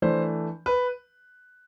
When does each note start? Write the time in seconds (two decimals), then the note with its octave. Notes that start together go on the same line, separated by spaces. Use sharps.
0.02 E3 A3 D4 C5
0.66 B4